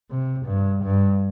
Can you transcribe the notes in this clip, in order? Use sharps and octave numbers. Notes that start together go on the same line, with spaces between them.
C3
G2
G2